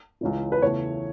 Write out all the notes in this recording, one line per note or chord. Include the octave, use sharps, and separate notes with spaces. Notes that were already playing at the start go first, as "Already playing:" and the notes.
C#2 C#3 E3
B4
E2 C#3 E3 A3 C#5